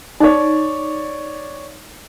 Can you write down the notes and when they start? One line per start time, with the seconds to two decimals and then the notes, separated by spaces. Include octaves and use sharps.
0.20 D#4 C#5 D5